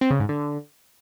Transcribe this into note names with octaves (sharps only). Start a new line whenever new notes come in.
C4
C#3
G#2
D3